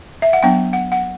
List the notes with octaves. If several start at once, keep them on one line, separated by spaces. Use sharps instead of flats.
E5
F#5
F#3 B3 D4 G5
F#5
F#5